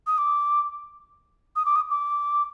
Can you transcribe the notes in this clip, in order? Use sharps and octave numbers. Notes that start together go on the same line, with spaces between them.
D#6
D6
D#6
D6
D#6
D6